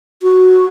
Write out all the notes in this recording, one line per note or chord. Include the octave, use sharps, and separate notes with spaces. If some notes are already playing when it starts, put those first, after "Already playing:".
F#4